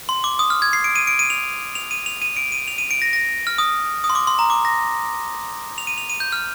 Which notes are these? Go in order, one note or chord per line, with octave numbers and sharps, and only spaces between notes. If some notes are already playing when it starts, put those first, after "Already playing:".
C6
D6
D#6
F6
G#6
C7
D7
D#7
D7
D#7
F7
F7
D#7
F7
D#7
D7
D#7
F7
D#7
D7
A#6
A#6
F6
D#6
D#6
C6
D6
C6
A#5
D6
A#6
F7
D#7
F7
D#7
G6
F6